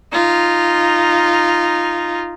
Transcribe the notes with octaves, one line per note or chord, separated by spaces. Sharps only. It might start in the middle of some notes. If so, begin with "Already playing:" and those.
D#4 F4